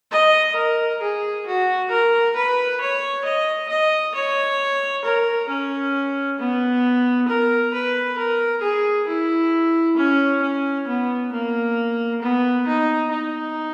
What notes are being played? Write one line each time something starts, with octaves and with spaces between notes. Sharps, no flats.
D#5
A#4
G#4
F#4
A#4
B4
C#5
D#5
D#5
C#5
A#4
C#4
B3
A#4
B4
A#4
G#4
E4
C#4
C#4
B3
A#3
B3
D#4
D#4